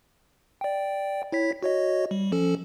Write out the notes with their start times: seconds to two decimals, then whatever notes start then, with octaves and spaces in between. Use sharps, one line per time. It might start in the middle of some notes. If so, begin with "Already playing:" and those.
0.61 D5 G5
1.32 E4 C#5 B6
1.63 F#4 C#5 D#5
2.11 G3
2.32 F3 C#4 A4